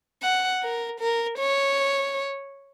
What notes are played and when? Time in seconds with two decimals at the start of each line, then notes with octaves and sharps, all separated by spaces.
0.23 F#5
0.62 A#4
1.00 A#4
1.39 C#5